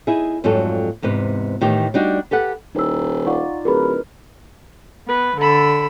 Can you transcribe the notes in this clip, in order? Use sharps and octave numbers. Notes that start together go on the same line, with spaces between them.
D#4 E4 G#4
F2 G#2 F#3 G3 F4 A4
E2 G#2 C3 B4
A2 D#3 E3 G4
G3 D4 D#4 F#4
G4 A4 B4 F#5
D#1 D#4 E4 E6
D#4 F4 D5 F5 F#5 C#6
D1 F#4 G#4 A#4 B4 B5
B3 B4
D3 A4 B5 E6